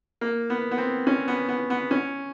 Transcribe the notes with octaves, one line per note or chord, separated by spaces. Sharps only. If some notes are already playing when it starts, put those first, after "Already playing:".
A#3
B3
B3
C4
C#4
B3
B3
B3
C#4